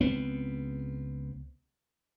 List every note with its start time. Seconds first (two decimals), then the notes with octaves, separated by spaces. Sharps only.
0.01 C#2 B3 C4